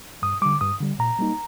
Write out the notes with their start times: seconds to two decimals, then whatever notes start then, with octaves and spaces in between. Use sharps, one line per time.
0.22 G2 D#6
0.42 D3 G3 D6
0.61 G2 D#6
0.80 D3 G3
0.99 A#2 A#5
1.19 G3 A#3 D#4